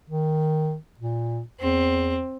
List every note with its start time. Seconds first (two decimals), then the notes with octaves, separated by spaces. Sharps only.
0.10 D#3
1.00 A#2
1.60 E2 C4